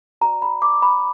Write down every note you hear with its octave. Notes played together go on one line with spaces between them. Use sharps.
F#4 D5 A#5
B5
D6
B5